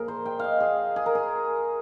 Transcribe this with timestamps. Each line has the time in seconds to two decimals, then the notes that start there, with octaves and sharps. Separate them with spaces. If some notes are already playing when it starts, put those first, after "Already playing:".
Already playing: A#2 F3 G#4 A#4
0.08 C5
0.25 G5
0.39 D#5 F5
0.60 G#4
0.96 G#4
1.06 A#4
1.15 G#4